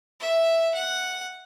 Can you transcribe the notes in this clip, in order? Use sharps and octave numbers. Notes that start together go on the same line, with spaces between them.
E5
F#5